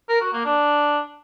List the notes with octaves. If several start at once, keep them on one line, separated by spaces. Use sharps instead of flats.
A#4
F#4
A#3
D4